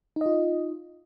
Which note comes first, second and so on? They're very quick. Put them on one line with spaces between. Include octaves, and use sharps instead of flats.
D#4 D#5 F4